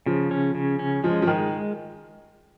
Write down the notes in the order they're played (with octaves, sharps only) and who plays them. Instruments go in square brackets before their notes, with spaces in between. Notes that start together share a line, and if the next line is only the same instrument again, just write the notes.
[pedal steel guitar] C#3 [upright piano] F3
[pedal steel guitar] C#4
C#3
C#4
[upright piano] F3 [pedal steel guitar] G#3
[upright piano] F3
[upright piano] D#3 [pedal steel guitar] G#3